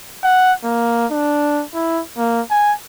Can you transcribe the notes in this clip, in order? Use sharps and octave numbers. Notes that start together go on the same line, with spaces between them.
F#5
A#3
D4
E4
A#3
G#5